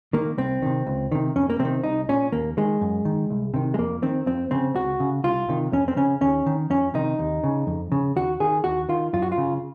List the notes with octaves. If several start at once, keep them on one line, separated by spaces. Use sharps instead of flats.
D#3 A#3
C2 C4
C3 D#3
C#2
C3 D#3
F2 C#4
A#3
C3 C4
D#3
C2 D#4
A#2 C#4
D#2 A#3
D#3 G#3
F#2
D#3
C2
C3 D#3
G#3
F2 A#3
D#3 C4
F2 C4
C#3 C4
C#2 F#4
C#3
C2 F4
C3 D#3
F2 C#4
C4
C#3 C#4
D#2 C#4
D#3
F2 C#4
C3 D#3 D#4
D#2
C#3
F2
C#3
D#2 F#4
D#3 G#4
D#2 F#4
D#3 F4
F#2 F4
F#4
F4
C#3